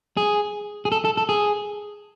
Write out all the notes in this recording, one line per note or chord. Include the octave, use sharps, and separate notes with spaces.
G#4
G#4
A4
A4
A4
G#4